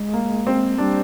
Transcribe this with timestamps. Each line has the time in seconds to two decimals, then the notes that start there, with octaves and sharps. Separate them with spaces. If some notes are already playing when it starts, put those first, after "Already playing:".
Already playing: G#3
0.13 A#3
0.47 C4
0.78 G3 D4